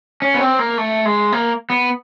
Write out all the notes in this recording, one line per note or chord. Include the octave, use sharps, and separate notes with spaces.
C#4
B3
C4
A#3
A3
G#3
A#3
B3